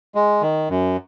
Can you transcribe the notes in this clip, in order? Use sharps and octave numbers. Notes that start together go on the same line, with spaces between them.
G#3
D#3
F#2